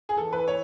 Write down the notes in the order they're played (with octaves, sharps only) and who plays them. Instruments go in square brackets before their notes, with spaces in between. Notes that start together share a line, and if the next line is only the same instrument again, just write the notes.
[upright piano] G#4
[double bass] E3 [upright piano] A4
[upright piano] B4
C#5